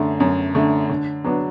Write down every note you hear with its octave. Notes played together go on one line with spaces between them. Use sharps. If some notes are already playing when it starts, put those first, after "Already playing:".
Already playing: F#2 D3 A3
F#2
D3 A3
D3
F#3 B3 D4